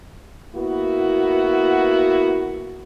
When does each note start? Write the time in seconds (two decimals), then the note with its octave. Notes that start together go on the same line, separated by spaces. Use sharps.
0.55 A#3 B3 E4 F#4